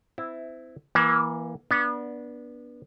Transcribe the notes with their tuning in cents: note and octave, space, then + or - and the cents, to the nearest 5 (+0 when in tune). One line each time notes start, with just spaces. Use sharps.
C4 -30 E4 +0
E3 +0 A#3 +25
B3 -25 D4 +0